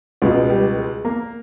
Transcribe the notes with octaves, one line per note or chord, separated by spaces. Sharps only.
C#2 B2 G#3
G3
G#3
A#3